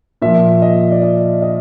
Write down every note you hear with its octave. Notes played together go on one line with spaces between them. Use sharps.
A#2 F3 E5
D#5
D5
D#5
D#5